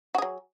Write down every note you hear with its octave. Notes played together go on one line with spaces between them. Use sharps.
F#3 F#4 G#4